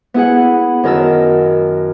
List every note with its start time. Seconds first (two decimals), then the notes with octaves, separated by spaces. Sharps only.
0.14 B3 E4 G#4 F#5
0.83 F#2 D#3 A#4 A5 E6